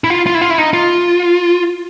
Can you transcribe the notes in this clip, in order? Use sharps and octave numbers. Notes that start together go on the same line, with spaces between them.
E4
F4
F4
E4
F4
E4
D#4
F4